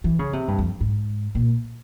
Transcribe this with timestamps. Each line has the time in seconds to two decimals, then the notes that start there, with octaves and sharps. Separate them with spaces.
0.04 E3
0.19 C#3
0.33 C3
0.48 G2
0.59 F2
0.81 G#2
1.35 A#2